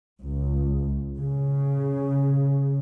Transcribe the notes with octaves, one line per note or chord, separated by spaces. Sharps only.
C#2
C#3